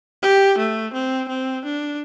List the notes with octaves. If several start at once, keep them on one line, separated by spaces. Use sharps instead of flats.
G4
A3
C4
C4
D4